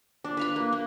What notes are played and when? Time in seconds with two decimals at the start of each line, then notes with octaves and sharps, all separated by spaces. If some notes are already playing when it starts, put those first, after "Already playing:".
0.24 D4
0.37 B4 F5 B5
0.56 A#3
0.72 A#3